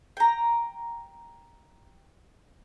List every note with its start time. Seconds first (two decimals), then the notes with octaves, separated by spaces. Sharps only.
0.17 G5 A#5